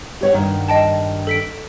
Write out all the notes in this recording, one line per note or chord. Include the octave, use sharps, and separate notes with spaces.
G4 C#5 F#5
G2 D#3
D#5 G5 A5
A4 B6 D7